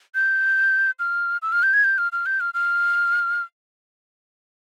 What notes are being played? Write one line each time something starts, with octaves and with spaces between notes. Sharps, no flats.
G6
F6
E6
F6
G6
G#6
G6
F6
F6
G6
F6
F6